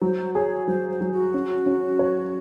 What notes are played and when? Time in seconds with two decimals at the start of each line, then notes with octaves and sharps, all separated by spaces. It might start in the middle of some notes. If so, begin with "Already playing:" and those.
0.01 F#3 C5
0.34 G#4 C#5
0.67 F#3 C5
0.89 C5
1.01 F#3
1.12 F#4
1.34 C#4
1.66 C#4
1.99 C#5